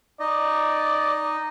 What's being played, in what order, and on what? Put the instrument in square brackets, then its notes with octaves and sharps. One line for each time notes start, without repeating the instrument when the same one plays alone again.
[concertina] D#4 D#5 [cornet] D5